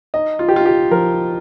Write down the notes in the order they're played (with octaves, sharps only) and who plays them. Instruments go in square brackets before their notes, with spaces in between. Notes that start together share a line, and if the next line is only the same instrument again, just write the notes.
[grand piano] D#4 D#5
F4
G4
D#4 F4
G4
F3 A#4